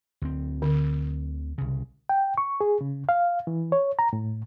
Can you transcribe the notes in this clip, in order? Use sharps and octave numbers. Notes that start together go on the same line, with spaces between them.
D2 C4
D3
C2 C#3
G5
C#6
G#4
C#3
F5
E3
C#5
A#5
A2